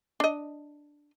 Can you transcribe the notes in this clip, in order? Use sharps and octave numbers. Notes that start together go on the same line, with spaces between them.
D4 D#5